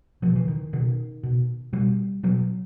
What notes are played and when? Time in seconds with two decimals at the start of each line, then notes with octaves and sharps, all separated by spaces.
0.22 B2 F3
0.36 E3
0.48 D#3
0.73 B2 D#3
1.23 B2
1.73 B2 G3
2.23 B2 F#3